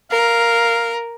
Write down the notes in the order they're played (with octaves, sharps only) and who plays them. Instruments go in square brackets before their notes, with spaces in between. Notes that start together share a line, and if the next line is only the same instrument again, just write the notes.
[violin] A#4 [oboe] F5